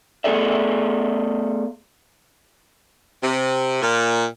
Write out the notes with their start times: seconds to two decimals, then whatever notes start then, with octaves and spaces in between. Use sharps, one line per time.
0.24 A3 B3 G#4 A4 D5 E5
3.23 C3
3.82 A#2